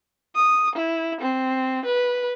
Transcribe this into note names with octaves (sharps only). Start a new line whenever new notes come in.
D#6
E4
C4
B4